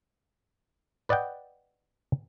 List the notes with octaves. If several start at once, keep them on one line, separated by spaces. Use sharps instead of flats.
B4 D5 D#5 F#5 G5